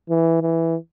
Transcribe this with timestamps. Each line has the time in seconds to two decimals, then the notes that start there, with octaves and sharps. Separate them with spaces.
0.10 E3
0.42 E3